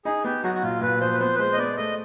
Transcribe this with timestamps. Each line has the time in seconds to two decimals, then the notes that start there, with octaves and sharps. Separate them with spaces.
0.05 D#4 G#4
0.24 B3 G4
0.43 F#3 F#4
0.54 F#4
0.63 A#2 F4
0.81 A#2 B4
1.01 F3 C5
1.12 B4
1.20 B3 C5
1.35 B4
1.39 G#3 C5
1.53 D#5
1.58 B3 D5
1.77 A3 D#5